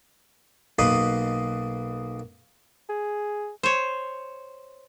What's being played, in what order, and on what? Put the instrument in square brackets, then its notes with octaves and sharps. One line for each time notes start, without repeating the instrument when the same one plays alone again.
[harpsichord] B1 A#3 B4 D#5 C6 D#6
[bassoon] G#4
[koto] C5 C#5